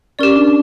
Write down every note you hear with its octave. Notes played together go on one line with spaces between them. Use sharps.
C#4 G4 A#4 D5
D4